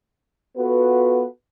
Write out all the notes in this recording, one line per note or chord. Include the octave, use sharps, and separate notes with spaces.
B3 F4 F#4 A4 B4